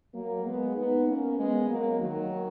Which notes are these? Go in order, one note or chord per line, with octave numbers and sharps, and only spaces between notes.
F#3 A#3
G#3 B3
B3 D#4
A#3 C#4
G#3 B3
F#3 A#3
D#3 F#3